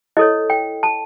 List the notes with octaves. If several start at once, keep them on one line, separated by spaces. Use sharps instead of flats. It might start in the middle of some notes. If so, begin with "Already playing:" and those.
E4 A4 C#5 D#5
G5
A5